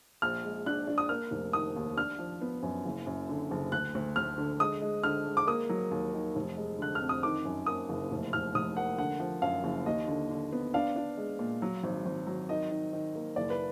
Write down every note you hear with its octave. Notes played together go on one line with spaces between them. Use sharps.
A#1 F6
G#3
D4 F#6
D4
D#6
A#3 F6
F1
D#3 D#6
D#2
D4 F6
F3
B3
F#2
F#1
F#2
D3
F#1
D2 F#6
D2
D2 F6
D3
G#3 D#6
G#3
D3 F6
G#3
D6
A#3 D#6
F#3
D#2
D#3
F1
G#3
D3 F#6
F6
F2
D#6
D#3 D6
F#2
A#3 D#6
F#1
F1
F1 F6
F1 D#6
A#3 F#5
D3 F#5
F3
F#2 F5
F#1
D#2 D#5
D3
D3
B3
D4 F5
D4
G#3
A#2
F#3
G#1
G#1
F#3
D#3 D#5
D#3
D#3
A#3
F#1 D5
B4